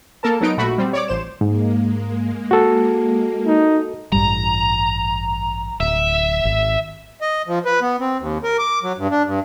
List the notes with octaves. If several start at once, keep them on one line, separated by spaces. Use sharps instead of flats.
A#3 A4 A#4 A5
F#3 B3 D#4 D7
A#1 A3 F#4 B5
G3 C4
C#5 D5 D6
A1 C5 E7
G#2 G#3 A#3
F#4 A4
D#4
A1 G2 G3 A#5
D1 E5
G#1
D#5
F3
B4
B3
C4
D#2
A#4
D6
F#3
G2
D4
G2